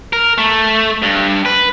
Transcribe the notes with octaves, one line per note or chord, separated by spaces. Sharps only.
A#4
A3
G2
B4